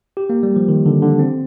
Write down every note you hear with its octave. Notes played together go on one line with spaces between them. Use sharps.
G4
A#3
G3
F3
D#3
D3
D3
C4